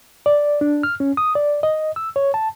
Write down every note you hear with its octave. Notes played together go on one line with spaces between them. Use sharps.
D5
D4
F6
C#4
D#6
D5
D#5
E6
C#5
A5